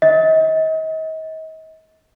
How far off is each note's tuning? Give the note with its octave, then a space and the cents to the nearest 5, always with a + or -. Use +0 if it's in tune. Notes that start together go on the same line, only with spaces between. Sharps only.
D#5 +35